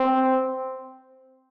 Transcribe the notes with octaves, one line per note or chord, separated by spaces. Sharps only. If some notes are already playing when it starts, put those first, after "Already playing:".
Already playing: C4